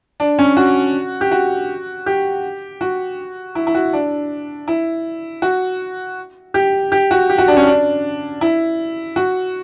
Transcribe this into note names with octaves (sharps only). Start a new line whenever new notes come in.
D4
C#4
F#4
G4
F#4
G4
F#4
E4
E4
F#4
D4
E4
F#4
G4
G4
F#4
G4
F#4
D4
C#4
D4
E4
F#4